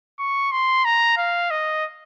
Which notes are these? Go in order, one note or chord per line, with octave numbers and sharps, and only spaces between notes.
C#6
C6
A#5
F5
D#5